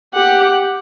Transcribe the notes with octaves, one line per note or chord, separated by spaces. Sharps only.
G4 F#5